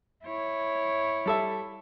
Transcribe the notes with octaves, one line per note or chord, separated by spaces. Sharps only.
E4 C#5
G3 A4 E5